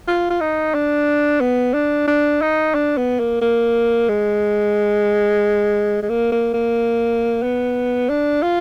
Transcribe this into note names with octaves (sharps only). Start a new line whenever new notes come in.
F4
F4
D#4
D4
B3
D4
D4
D#4
D4
B3
A#3
A#3
G#3
G#3
A#3
A#3
A#3
B3
D4
F4